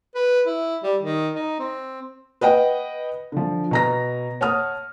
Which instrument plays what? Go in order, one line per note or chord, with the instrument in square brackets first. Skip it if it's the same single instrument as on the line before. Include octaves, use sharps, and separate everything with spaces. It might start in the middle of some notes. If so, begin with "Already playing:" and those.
[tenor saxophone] B4
E4
G3
D#3
D#4
C4
[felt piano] B4 D#5 F#5 G5
D3 F3
B2 A#5 A#6
C#5 F#5 A5 D#6 F6